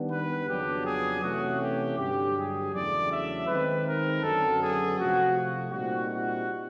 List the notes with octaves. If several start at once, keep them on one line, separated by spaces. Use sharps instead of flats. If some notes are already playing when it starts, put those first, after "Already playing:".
Already playing: D#3 G3 B3 D4
B4
F2 C#3 F#3 B3 D4 G4
G#4
C3 E3 A3 C#4 F#4
G4
G2 D3 F#3 G4
G#4
E2 C#3 F#3 A3 D4 D5
E5
D#3 G#3 C4 D#4 B4
A#4
F#2 D3 F#3 B3 A4
G#4
C3 F3 A3 F#4
A#2 G3 C4 D#4 F#4
F#4